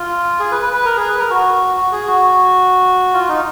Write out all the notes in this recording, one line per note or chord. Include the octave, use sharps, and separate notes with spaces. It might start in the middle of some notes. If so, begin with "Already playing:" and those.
Already playing: F4
G#4
B4
B4
B4
A#4
G#4
B4
A#4
F#4
F#4
G#4
F#4
F4
D#4